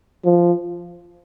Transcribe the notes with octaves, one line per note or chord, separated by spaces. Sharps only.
F3